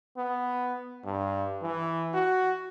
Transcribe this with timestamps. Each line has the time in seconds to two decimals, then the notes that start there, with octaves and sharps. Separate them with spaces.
0.17 B3
1.04 G2
1.62 E3
2.14 F#4